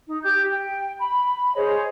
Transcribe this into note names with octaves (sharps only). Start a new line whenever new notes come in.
D#4
G4 G6
G5
B5
G#4 C5 C#5 D#5